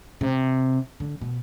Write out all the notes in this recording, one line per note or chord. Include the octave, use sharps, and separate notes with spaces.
C3
D3
B2